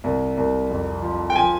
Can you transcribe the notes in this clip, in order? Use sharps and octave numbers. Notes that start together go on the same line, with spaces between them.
C2
C2
F2
F3
G5
F3 G#5